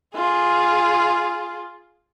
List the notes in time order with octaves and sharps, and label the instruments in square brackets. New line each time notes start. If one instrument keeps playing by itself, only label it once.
[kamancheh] F4 G#4